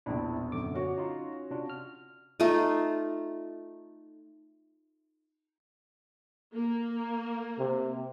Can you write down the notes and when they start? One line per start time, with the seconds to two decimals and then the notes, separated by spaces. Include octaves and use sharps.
0.06 E1 A#1 C3 D4 E4
0.52 F#2 D3 D6
0.74 C#4 F#4 C#5
0.98 D#4 F4
1.51 C3 D4 F4
1.70 F6
2.40 A3 D#4 F4
6.55 A#3
7.59 C3